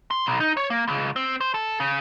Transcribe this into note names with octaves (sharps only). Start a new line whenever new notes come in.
C6
B1
D#4
C#5
A#3
C#2
C4
C5
A4
C#3